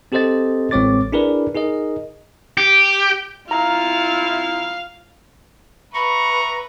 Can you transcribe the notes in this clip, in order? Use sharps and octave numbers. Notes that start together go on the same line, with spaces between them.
C4 G4 A4 C5 D#5 A6
A1 G#3 C4 C#5 D6 A6
D4 E4 G#4 A#4 B4 D5
D#4 G#4 A#4 D#5
G4
C4 E4 F4 F5 A#5
B4 E5 A#5 B5 C#6